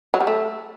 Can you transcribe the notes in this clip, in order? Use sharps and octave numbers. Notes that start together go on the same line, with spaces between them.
F#3
G3
A3